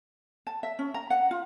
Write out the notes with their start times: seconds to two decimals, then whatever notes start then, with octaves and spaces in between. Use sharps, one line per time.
0.47 A5
0.63 E5
0.79 C#4
0.94 A#5
1.10 F#5
1.31 F4